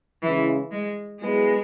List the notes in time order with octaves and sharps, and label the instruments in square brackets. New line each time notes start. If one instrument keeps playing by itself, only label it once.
[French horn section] C#3 G#3 E4 [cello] E3
[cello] G#3
[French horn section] F#3 B3 E4 G#4 B4 [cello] G#3